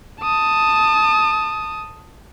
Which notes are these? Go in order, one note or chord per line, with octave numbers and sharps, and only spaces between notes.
A5 D#6